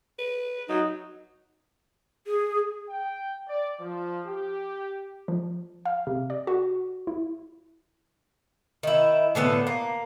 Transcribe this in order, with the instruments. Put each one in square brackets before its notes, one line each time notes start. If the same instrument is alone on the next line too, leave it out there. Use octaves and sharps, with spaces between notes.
[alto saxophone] B4
[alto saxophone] F#3 [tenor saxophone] D#4
[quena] G#4
[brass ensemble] G5
D5
F3
G4
[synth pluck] F3
F5
C3
D5
F#4
E4
[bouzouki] D#3 E4
A2 D3 B3 A4
A#3